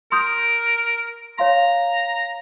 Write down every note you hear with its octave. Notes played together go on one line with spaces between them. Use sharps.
A#4 C6 D#6 G6
C#5 F5 A#5 C6